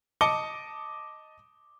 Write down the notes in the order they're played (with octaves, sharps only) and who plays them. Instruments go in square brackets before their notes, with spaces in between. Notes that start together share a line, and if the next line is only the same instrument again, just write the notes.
[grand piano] D#5 A5 D6 C#7 G7